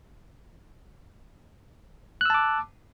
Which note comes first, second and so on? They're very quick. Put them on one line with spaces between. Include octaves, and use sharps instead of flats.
F#6 E6 A5 D6